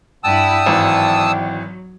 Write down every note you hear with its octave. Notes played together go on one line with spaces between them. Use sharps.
G2 E4 D5 F#5 G5 A5 D#6 E6
G#1 E3 F#3